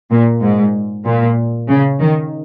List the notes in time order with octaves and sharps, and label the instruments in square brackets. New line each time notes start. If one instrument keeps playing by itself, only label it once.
[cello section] A#2
G#2
A#2
C#3
D#3